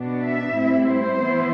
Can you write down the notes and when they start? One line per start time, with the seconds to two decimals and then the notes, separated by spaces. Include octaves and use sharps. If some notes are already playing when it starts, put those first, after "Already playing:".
Already playing: B2 B3 D4
0.23 E5
0.56 A2 G3 C4 E4
0.89 C5
1.21 E3 B3 E4